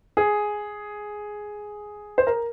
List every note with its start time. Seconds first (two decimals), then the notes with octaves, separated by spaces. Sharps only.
0.17 G#4
2.18 C5
2.27 A#4